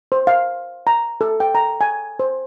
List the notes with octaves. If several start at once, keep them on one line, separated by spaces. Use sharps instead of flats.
C5
F5
A#5
A4
G5
A#5
G#5
C5